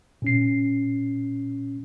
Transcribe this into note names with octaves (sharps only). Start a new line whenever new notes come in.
A#2 C#4 C7